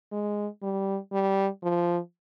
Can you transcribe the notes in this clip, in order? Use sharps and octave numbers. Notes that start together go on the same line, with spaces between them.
G#3
G3
G3
F3